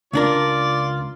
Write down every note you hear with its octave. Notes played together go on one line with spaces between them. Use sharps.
C#2 D4 F4 A#4 D5